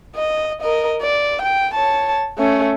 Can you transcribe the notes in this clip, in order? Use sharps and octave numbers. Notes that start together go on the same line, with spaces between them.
D#5
A#4 D#5
D5
G5
C#5 A5
A3 C#4